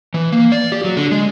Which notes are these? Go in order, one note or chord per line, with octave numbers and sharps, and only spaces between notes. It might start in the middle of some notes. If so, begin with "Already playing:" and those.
E3
A#3
D5
G4
F#3
D3
G#3